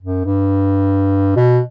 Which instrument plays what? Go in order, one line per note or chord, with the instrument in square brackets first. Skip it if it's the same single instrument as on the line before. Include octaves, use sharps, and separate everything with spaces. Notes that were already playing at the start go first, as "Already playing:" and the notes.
[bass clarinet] F#2
G2
B2